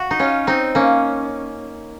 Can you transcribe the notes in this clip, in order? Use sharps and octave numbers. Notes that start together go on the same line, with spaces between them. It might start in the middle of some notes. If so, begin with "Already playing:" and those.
Already playing: F#4
D#4
C#4 F4
C4 D#4
A#3 C#4